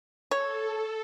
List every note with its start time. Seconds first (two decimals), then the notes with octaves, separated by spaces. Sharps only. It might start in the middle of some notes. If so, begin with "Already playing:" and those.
0.31 A4 C#5